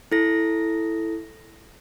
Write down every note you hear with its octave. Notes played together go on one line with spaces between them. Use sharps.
E4 A4 A#6